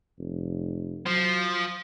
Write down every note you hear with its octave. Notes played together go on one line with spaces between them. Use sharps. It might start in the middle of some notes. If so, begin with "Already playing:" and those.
F1
F3 F#3